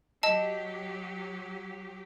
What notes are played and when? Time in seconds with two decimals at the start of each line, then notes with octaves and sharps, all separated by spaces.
0.23 F#3 G4 D#5 A5